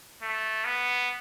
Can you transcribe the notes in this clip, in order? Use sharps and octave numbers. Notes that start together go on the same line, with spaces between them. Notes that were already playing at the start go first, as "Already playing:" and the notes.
A3
B3